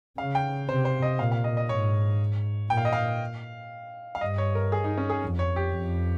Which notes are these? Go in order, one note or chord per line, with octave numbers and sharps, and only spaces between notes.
C#3 F5
G5
C3 C5
C5
D#5
A#2 F5
F5
D#5
D#5
G#2 C#5
A#2 G5
F5
D#5
F5
F5
G2 D#5
C#5
A#4
G#4
D#4
C#4
G#4
F2
C#5
G4
F2